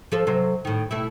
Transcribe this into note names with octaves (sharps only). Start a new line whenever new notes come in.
F3 A4 C5
C3 F#3 C5
A2 D#3
B2 A3 E4